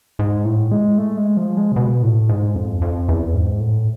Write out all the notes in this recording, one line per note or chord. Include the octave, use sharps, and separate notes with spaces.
G#2
A2
G#3
A3
G#3
F3
G#3
C3
B2
A2
G#2
F2
F2
E2
G#2
A2